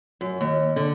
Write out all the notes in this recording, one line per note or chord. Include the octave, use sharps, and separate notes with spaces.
F#2
D#2
D3